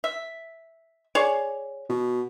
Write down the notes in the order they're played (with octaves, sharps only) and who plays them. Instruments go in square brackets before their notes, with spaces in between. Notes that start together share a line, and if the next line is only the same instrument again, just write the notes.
[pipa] E5
G#4 C#5 D5
[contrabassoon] B2